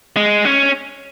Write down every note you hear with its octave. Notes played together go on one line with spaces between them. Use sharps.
G#3
C#4